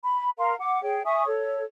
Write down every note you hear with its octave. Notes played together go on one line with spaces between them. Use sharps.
B5
A#4 F5 A#5 C6
F#5 D6
G#4 C#5 G5
E5 G#5 C#6 D#6
A4 C#5